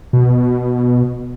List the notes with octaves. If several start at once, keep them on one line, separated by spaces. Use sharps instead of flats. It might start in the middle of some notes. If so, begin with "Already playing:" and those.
B2